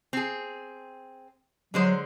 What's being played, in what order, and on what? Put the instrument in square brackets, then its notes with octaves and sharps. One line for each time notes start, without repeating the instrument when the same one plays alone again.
[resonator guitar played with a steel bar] C4 G#4
[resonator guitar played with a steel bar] D3 G#3 C5 [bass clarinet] F#3